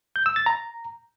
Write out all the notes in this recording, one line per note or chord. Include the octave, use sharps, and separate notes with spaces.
G6
E6
A6
A#5